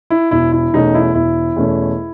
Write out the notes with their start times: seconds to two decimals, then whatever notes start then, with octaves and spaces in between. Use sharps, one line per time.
0.10 E4
0.31 E1 E4
0.52 E4
0.73 E2 B2 A3 C#4 D#4
0.94 E4
1.15 E1 E4
1.56 E2 B2 A3 C#4